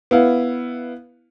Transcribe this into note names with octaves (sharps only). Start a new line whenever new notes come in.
B3 E4 F5